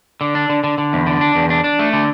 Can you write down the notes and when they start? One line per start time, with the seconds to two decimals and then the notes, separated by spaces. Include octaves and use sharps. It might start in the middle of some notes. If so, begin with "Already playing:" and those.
0.21 D3
0.35 D4
0.50 D3
0.64 D3
0.78 D3
0.93 E2
1.07 D3
1.21 D4
1.36 E2
1.50 D4
1.64 D4
1.79 A3
1.93 D3